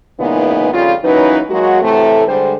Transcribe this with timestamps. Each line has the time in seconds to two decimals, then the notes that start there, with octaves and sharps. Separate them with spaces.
0.18 A#2 C#3 E3 G#3 B3 D#4
0.72 F2 C#3 G3 F4
1.04 E3 F#3 A#3 C#4 D#4 B4
1.50 F#3 G#3 A#3 F#4
1.82 A2 C3 E3 A3
2.28 D3 G3 G#3 C5